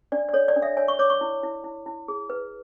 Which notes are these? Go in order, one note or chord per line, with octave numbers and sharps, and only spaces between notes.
D4 D5
D5
A4 C#5
D5
D4
E5
C#5 G#5
C#6
C#5 D6
C#6
E4
E4
E4
E4
G#4
B4